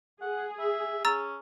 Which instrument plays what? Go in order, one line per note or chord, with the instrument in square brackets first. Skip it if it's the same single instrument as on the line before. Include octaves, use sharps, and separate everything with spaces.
[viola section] G#4 [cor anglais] F#5
[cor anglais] E5
[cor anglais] C#4 [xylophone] A#5 E6 A6